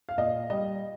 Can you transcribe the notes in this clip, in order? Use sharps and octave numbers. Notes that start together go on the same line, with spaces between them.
F5
A#2 D#5
G3 D#5